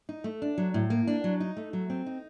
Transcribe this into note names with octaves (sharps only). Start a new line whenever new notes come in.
D#4
A3
D4
F#3
A2
A#3
D4
F#3
D#4
A3
F#3
C4
D#4